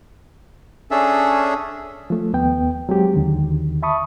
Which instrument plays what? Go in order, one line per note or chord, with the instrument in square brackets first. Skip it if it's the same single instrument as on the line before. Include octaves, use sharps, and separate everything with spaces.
[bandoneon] C#4 D4 G#4 A4 E5
[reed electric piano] F3 A3
D#2 B3 G5
F#3 G#3 C4 G4
D#2 D3 D#3
E5 A5 B5 C#6 D#6